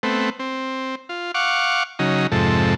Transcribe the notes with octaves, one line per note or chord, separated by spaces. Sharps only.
A3 B3 C4
C4
F4
F5 F#5 C#6 D6
C#3 F#3 D#4
F2 G#2 C3 A4